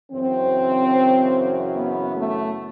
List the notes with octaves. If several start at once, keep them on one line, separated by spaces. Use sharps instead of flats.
F#2 C#3 E3 C4
B3
A3